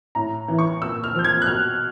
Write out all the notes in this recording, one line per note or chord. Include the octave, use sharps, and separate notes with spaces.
A2 A#5
E3
C#6
A#2 E6
F6
F3 G6
G#6
F#6
B2 F6